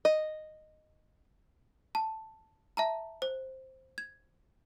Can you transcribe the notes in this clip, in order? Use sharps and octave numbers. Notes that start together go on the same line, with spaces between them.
D#5
A5
E5 A5 A#5
C5
G#6